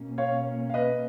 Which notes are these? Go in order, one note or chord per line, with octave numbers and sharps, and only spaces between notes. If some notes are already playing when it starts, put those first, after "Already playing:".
Already playing: B2 A#3 C#4
C#5 F5
F5
B4 D#5